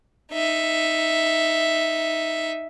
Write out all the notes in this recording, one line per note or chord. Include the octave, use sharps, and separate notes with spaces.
D#4 E5